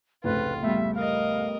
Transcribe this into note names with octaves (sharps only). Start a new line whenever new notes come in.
F1 C#2 A2 F4 B4
G3 A3 B3 E5
A#4 D#5 F5